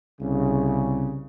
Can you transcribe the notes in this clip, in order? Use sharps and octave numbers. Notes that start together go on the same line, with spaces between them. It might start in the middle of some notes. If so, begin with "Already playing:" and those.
C2 C#3